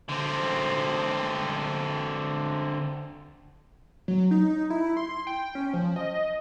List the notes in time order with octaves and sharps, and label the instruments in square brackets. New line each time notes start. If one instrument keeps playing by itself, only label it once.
[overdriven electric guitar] D3 C4
[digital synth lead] F#3
D#4
E4
C6
G5
C#4
F3
D#5